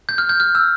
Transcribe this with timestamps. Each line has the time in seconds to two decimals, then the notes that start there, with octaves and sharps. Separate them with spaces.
0.09 G6
0.18 F6
0.29 G6
0.40 F6
0.55 E6